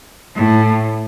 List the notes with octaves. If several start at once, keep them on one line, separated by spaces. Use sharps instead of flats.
A2